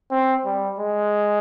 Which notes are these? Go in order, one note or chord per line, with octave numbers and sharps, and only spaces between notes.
C4
G3
G#3